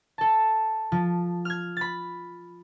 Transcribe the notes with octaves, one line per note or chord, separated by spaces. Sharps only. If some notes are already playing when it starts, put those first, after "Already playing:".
A4 A5
F3
F6 G#6
B5 A6